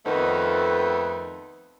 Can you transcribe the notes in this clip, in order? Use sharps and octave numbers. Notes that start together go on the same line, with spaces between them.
F2 D#3 A3 B3 D#4